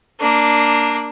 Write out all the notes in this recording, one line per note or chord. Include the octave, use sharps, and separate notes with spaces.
A#3 D4